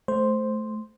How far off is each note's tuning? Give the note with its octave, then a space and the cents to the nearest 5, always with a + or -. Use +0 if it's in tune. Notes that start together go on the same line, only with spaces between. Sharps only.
A3 -20 C5 +0